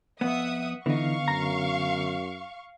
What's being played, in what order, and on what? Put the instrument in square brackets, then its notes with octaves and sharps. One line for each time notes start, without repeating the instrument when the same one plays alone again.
[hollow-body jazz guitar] F2 B3 [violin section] E5 F#5 D#6
[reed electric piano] D3 B3 [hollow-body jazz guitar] E3 D#4 [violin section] F5 C#6
[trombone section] F#2 [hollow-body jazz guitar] A#5